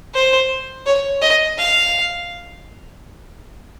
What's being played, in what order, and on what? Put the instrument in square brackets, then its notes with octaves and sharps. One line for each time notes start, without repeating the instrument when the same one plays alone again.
[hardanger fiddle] C5
C#5
D#5
F5